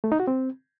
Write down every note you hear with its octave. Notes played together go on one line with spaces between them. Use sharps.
A3
D#4
F#4
C4